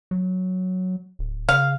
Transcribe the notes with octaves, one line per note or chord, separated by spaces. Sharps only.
F#3
D1
C#3 F5